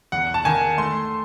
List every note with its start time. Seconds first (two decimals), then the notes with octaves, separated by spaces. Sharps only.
0.12 E2 F#5
0.34 A5
0.45 D#3 G#5
0.78 A3 C6